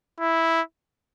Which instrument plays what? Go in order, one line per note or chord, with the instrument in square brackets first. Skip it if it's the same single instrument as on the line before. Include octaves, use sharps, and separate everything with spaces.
[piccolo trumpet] E4